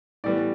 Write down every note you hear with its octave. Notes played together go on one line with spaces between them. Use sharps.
A2 E3 G3 B3 D5